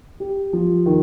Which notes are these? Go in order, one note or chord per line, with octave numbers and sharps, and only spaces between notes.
G4
F3
D#3